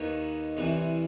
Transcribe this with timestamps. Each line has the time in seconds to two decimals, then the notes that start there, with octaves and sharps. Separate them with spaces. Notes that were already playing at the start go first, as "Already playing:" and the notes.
Already playing: D#2 D#3 B4 C#5
0.57 C2 C3 E3 B4 C#5